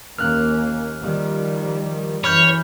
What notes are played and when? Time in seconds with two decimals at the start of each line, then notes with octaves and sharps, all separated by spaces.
0.19 D#2 A#3 C#4 F6 F#6
1.02 D#3 F3 G3
2.24 F#2 E3 C#5 B5 F6 G6